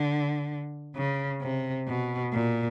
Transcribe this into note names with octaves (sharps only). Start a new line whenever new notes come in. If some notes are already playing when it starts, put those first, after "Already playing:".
Already playing: D3
C#3
C3
B2
A#2